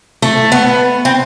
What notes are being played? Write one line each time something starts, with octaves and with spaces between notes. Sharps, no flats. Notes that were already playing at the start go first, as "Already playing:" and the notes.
A3
B3
C4